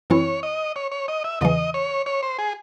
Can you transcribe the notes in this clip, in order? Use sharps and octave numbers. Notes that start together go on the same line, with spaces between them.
F#2 E3 C4 E4 C#5
D#5
C#5
C#5
D#5
E5
E2 C#3 E3 D#5
C#5
C#5
C5
G#4